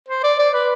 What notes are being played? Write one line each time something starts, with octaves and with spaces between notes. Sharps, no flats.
C5
D5
D5
B4